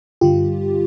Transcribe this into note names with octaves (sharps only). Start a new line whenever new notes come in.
G2 D3 G3 F4 G4